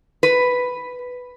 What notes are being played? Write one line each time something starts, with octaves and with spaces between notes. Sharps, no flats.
B4